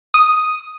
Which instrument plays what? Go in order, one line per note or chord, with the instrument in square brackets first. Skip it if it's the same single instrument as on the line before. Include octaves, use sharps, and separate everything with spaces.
[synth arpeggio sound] D#6